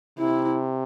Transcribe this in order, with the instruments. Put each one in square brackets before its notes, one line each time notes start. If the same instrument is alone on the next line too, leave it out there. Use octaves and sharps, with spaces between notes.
[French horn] C3 [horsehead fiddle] E4